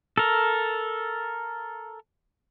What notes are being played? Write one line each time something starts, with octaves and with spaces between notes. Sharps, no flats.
A4 A#4